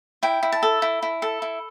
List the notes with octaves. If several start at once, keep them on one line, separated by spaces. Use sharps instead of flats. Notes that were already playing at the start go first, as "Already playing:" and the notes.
E4 G5
E4
A5
A4
E4
E4
A4
E4